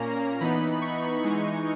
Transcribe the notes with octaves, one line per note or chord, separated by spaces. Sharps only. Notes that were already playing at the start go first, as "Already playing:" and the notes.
Already playing: A#2 A#3 C#4 A#5
E3 B3 D#4 B5
C#6
E3 G#3 D#4